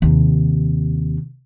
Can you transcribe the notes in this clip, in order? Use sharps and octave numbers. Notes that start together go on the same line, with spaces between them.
D#2 C3